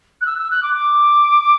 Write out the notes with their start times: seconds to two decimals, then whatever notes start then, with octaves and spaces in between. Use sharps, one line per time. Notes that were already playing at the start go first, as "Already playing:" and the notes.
0.21 F#6
0.26 E6
0.38 E6
0.51 F#6
0.63 D6
0.74 D6